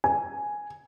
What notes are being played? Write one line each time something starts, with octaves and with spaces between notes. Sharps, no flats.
G#5